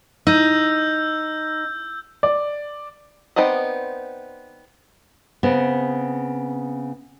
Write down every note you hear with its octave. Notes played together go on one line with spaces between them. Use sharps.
D#4 E6 G6
D5
B3 C4 D#4 D5 D#5
C#3 B3 C4